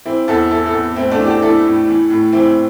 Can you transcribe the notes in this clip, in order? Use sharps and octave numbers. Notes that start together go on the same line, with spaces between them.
E3 C4 E4
E2 E4 A4
E3 E4 A4
E4 A4
E2
A2 C4 E4
A3 D4
E3
D4 G4
E3 E4 A4
A2
E3
A2
E3 C4 E4